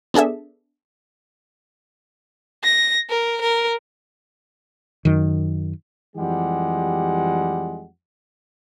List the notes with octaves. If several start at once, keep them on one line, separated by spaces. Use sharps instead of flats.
B3 D4 G#4 A4 E5
A#6
A#4
A#4
F#2 D#3
F2 E3 G3 G#3 G4 F#5